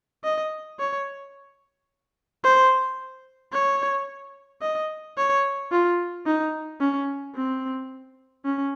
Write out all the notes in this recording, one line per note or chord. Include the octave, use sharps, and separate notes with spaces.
D#5
C#5
C5
C#5
D#5
C#5
F4
D#4
C#4
C4
C#4